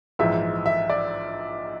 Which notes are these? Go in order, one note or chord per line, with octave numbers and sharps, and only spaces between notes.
A#1 G#2 E3 E5
E5
D5